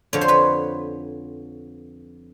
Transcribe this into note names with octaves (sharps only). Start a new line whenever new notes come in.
F2 D3 F3 C#5
C5
B4 C#5